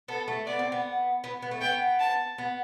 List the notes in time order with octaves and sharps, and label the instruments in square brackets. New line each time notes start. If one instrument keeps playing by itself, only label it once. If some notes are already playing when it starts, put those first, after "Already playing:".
[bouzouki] B3 [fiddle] A4
[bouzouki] A3
[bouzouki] B3 [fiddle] D5
[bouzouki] C4
B3
B3
B3
A3
[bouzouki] B3 [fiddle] G5
[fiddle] A5
[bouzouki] B3